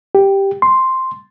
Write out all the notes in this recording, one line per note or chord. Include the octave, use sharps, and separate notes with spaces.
G4
C6